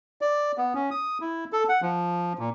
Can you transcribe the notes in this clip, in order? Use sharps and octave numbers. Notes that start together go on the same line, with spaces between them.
D5
B3
C#4
D#6
E4
A4
F#5
F3
A#2